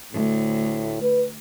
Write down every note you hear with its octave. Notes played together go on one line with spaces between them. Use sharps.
D2 A2
B4